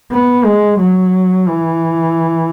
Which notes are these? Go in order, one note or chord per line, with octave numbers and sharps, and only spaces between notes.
B3
G#3
F#3
E3